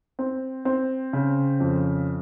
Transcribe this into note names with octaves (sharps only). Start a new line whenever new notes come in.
C4
C4
C#3
F2